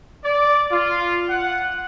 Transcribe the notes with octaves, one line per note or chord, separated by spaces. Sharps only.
D5
F4
F#5